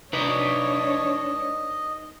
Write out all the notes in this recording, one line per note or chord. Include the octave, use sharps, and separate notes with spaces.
D4 D#4 B4 C#5 D#5